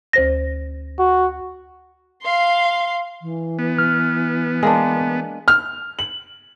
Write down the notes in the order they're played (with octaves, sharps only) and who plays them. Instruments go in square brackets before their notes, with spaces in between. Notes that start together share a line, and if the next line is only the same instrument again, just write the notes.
[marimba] D2 C5 A#6
[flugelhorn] F#4
[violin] F5 C6
[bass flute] E3
[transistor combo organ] B3
[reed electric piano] F6
[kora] G#3 A#3 D4
[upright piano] F6
F#7